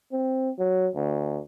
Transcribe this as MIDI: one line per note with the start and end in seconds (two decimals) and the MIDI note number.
0.12 0.50 60
0.59 0.89 54
0.96 1.40 38